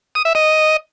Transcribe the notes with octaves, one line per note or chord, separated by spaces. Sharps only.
D#6
E5
D#5